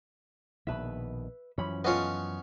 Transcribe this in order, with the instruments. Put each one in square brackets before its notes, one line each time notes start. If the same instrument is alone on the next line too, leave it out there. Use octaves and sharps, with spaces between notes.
[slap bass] A#1 B2 D#3 [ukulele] B4 E5
[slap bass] F#2 E3 F3 [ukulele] C#4 B5
[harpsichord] B3 C#4 C#5 [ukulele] F4 A4 D#5